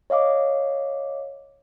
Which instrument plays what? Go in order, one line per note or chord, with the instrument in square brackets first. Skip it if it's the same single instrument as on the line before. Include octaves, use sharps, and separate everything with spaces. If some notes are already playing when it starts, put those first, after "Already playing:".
[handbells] C#5 D#5 F5 D6